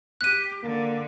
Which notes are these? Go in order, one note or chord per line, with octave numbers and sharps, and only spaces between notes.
G4 F#6 D#7
D3 A#3